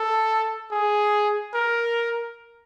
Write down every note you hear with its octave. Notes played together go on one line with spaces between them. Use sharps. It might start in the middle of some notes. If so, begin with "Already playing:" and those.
Already playing: A4
G#4
A#4